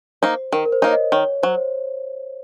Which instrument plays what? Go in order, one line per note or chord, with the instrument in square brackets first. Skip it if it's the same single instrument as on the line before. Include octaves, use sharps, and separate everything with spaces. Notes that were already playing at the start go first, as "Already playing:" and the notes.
[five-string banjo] A#3 D#4 [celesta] C5
[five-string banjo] D#3 [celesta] A#4
[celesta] A#4
C5
[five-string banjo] A#3 D#4 [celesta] C#5
[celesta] D#5
[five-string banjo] D#3 [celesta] C#5
[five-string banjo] F#3 [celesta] C5